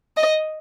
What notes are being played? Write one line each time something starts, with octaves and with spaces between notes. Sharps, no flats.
D#5